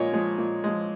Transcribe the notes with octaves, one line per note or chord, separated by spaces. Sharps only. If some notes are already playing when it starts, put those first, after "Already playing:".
Already playing: A#2 F3 G#3 A#4 C#5 D#5 G#5
F3 G#3
A#2
F3 G#3